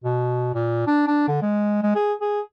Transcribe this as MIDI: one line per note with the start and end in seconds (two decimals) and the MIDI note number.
0.04 0.52 47
0.54 0.82 46
0.87 1.04 62
1.07 1.26 62
1.28 1.40 50
1.42 1.82 56
1.83 1.94 56
1.95 2.14 68
2.21 2.41 68